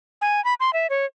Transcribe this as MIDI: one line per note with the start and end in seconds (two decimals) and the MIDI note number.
0.21 0.43 80
0.45 0.54 83
0.60 0.73 84
0.73 0.87 76
0.90 1.05 73